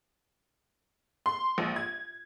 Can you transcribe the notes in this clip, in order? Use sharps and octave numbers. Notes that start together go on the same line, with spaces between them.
C6
A#1
G#6